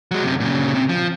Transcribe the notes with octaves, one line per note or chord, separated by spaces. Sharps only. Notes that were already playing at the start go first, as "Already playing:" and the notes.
F#3 G#3
F#2 C3
A#2 C#3
C3
F3